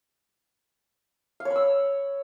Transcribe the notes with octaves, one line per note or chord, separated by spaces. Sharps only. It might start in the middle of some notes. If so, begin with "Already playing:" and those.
F5
C#5
B5
E6